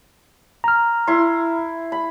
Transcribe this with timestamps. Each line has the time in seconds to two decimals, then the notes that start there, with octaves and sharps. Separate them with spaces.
0.64 A#5 F6
1.07 E4 C6
1.92 B5